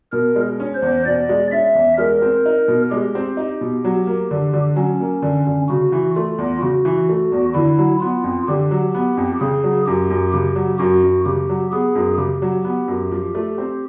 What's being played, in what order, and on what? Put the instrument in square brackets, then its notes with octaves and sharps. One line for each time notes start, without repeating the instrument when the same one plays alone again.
[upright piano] B2 [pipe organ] A#4
[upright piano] G#3
C#4
[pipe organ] C5
[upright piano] E2
[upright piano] B2 [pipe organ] D5
[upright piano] G#3
[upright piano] C#4 [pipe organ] E5
[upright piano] E2
[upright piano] G#3 [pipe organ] A#4
[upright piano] C4
D#4
B2
[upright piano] G#3 [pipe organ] G4
[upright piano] C4
D#4
B2
F#3
A#3
D3
D3
[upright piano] F#3 [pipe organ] C#4
[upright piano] A#3
D3
D3
[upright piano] C#3 [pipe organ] F#4
[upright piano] E3
[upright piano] A3 [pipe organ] F4
[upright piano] E2
[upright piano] C#3 [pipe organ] F#4
[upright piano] E3
A3
E2
[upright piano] D3 [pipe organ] E4
[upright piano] F#3
[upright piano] B3 [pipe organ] F4
[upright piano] F2
[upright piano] D3 [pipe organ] G4
[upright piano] F#3
B3
F2
[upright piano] C#3 [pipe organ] G#4
[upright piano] F#3
[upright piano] F#2 [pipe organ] G4
[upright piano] F#2
[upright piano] C#3 [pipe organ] G4
[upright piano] F#3
[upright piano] F#2 [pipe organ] F#4
[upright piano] F#2
[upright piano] C#3 [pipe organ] G4
[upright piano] F#3
[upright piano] B3 [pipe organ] G#4
[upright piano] F#2
[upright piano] C#3 [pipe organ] G4
[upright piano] F#3
B3
F#2
F3
A3
C4